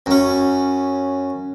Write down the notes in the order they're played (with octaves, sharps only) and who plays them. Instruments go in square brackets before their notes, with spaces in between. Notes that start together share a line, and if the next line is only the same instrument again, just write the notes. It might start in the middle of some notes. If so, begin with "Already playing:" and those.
[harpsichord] F#2 C#4